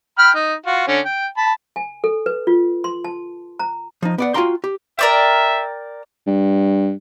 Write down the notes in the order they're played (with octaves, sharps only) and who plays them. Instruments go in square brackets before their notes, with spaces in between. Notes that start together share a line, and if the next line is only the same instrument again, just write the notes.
[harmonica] G5 B5 F6
D#4
F4 F#4
D3 C#4
G5
A5 B5
[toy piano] G#5
A4
B4
F4
C6
A5
A#5
[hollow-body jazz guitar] F3 D#4
B3 D5 F#5
F4 F#4 F5 G5 A#5 C6
G4
[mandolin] A#4 D5 G5 [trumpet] E5
[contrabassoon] G2